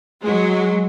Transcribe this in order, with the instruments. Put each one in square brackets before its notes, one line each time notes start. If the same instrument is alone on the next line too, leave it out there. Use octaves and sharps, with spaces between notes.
[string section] F#3 G#3